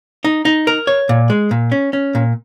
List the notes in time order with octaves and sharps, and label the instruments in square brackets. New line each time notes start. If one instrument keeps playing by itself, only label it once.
[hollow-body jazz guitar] D#4
D#4
A#4
C#5
A#2
G#3
A#2
C#4
C#4
A#2